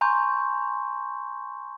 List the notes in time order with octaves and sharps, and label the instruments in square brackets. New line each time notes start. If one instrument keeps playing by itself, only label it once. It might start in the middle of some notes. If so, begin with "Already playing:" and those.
[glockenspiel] G#5 A#5 C6 C#6 G6